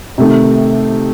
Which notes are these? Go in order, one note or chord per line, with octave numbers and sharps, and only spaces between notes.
C3 D#3 A3 D#4